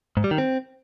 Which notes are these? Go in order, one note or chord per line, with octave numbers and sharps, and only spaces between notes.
G#2
G3
D#3
C4